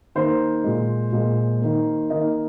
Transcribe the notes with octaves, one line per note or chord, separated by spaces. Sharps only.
D#3 A#3 C5
A#2 G#3
A#2 G#3
D#3 A#3
D#3 A#3 D#5